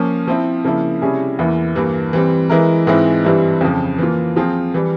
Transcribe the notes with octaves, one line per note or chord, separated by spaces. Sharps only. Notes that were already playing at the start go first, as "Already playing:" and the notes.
Already playing: F3 A#3 C#4
F3 C4 E4
C#3 F3 A#3 E4
C3 G3 C#4 E4 G#4
E2 E3 A#3 E4
G2 E3 A#3
E3 G3 C4
E3 G#3 E4 A#4
G#2 E3 G#3 C4 E4
G2 E3 G3 C4 E4
F2 C#3 F3
E3 A#3 F4
F3 C4 F4 G#4
E3 G3